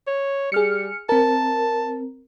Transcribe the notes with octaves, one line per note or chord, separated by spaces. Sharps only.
C#5
G3 G#4 F6 C#7
C4 A#4 A5